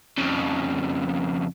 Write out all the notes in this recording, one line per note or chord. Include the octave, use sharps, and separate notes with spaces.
F2 C#3